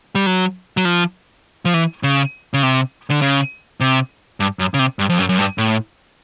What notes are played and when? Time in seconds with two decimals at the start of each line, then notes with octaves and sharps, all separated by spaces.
0.15 G3
0.26 F#3
0.77 F#3
0.85 F3
1.65 F3
1.74 E3
2.03 C#3
2.54 C#3
2.63 C3
3.10 D3
3.22 C#3
3.80 C3
4.40 G2
4.59 F#2
4.74 C#3
4.79 C3
4.99 G2
5.09 F2
5.18 F#2
5.29 F#2
5.38 G2
5.58 A2